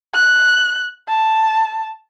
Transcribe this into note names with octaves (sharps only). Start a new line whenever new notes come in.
F#6
A5